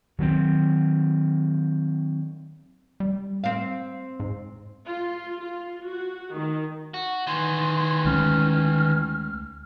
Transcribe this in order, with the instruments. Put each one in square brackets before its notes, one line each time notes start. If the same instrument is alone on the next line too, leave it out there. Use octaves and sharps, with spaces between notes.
[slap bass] D#3 F#3 G3 C4
[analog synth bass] G3
[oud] C4 F5
[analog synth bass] G#2
[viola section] F4
F4
F#4
D#3
[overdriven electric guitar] F#4
[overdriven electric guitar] D#3 E3 [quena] C6
[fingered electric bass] D2 G#3 C#4 [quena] F6